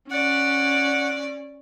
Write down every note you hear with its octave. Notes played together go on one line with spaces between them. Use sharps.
C#4 D5 F#5